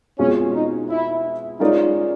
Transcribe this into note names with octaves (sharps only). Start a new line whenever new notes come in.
B2 G#3 C4 C#4 F4 G#4
D#4
E4
G#3 C#4 D#4 F4 A#4 D5